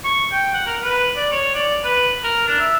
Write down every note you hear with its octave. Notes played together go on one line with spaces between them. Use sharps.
C#6
G5
F#5
A#4
B4
D5
C#5
D5
B4
A#4
D4
E5